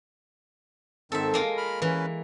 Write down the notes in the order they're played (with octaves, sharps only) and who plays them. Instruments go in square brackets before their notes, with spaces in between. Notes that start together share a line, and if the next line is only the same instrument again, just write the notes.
[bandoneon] G#2 D#3 C4 [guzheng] A4 E5
[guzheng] G#3 A#3 F4
[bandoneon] B5 F6
[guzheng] E3 [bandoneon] C#4 B4